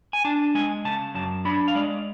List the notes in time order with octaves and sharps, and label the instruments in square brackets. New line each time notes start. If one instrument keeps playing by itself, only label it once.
[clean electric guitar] G#5
D4 A5
G#3 G#5
C#3 A5
F#2 A5
D4 B5
F5
G#3 D5